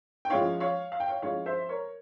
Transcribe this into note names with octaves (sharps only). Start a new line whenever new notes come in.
G5
F3 G#3 C#4 E4 C#5 F5
C#5 F5
F5
G5
C#5 F5
F3 G#3 C#4 E4 C#5 F5
C5 E5
A#4 C#5